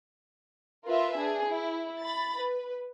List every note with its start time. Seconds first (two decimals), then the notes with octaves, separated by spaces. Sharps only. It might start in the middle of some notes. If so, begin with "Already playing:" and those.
0.86 F4 A#4 B4 E5
1.16 D4 G#4
1.49 E4
2.00 B5 A6
2.36 B4